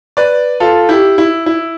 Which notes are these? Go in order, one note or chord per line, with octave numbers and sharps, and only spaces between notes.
B4 D5
F4 A4
E4 G4
E4
E4